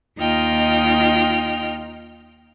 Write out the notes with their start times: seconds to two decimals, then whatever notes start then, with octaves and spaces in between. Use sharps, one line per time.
0.18 D#2 D#4 F4 D#5 G5 F6